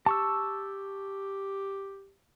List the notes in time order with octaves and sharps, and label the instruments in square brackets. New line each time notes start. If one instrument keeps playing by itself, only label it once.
[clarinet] G4 [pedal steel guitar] A5 C#6 E6